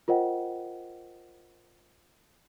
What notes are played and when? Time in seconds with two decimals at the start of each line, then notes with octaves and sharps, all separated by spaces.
0.08 F4 A#4 C5 D#5 F#5 G5